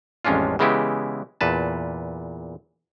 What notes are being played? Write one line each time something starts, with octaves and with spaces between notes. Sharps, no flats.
A1 F2 G#3 C#4 D4 F4
C#3 E3 G#3 B3 E4 G4
E2 A#2 B4 A5